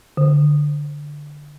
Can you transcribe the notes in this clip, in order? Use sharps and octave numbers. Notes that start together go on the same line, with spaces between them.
D3